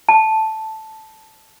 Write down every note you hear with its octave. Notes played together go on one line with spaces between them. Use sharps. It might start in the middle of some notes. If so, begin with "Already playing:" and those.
A5